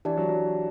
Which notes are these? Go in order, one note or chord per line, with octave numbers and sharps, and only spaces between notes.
E3 D4 G4 D5 A5
F#3
F#3